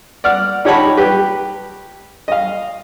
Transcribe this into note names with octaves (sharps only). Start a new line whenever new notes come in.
D5 F#5 F6
D#4 G4 C#5 F#5 A5 B5
G4 B4
D#5 F5